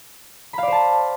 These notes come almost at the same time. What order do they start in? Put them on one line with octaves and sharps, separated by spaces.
B5 F5 D5 C5 A5